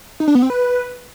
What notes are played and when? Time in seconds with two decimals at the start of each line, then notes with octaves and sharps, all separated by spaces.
0.20 D#4
0.28 D4
0.35 B3
0.42 C4
0.50 B4